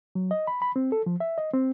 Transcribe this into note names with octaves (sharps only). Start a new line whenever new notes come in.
F#3
D#5
B5
B5
C4
A4
F3
E5
D#5
C4